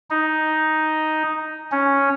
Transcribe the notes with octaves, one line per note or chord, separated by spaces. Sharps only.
D#4
C#4